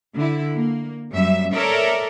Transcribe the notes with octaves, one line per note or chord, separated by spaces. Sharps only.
D3 E4
A#3
F#2 G3 E5
A4 A#4 C#5 D5 E5